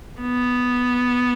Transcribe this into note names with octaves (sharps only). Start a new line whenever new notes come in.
B3